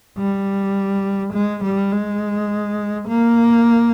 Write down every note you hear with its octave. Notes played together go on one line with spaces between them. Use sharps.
G3
G#3
G3
G#3
A#3